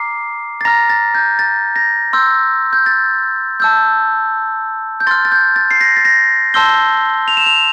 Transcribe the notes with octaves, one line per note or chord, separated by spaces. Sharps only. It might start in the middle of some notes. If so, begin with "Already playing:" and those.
Already playing: A#5 D6 F6 C7
A6
A#5 F6 A#6
A6
G6
A6
A#6
C6 E6 G6
G6
A6
A5 E6 G6
G6
C6 F6 A6
A6
G6
A6
C7
A#6
A6
A#6
A5 C6 E6 G6 G7
F7
E7
F7